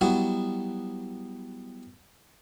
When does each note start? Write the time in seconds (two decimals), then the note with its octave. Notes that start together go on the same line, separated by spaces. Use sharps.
0.01 F#3 G3 B3 E4 F#4